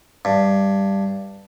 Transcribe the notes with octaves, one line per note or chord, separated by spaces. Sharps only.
G2